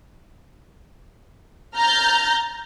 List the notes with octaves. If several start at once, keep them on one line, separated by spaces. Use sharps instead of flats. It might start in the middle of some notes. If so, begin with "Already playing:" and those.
A#5 F6 G6 A6